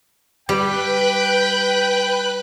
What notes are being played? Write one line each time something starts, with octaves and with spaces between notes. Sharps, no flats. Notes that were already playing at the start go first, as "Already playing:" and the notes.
G3 B4 G5 B5 F#6